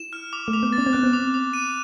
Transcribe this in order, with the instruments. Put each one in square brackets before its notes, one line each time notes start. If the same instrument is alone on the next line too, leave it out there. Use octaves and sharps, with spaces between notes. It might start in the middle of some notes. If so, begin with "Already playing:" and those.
Already playing: [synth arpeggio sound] E4 [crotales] E7
[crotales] F6
D6
[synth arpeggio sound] A3
[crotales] D6
[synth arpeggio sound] B3
[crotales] A6
[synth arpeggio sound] C#4
C4
[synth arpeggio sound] B3 [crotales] F#6
[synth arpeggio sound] C4
[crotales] D6
D6
D#7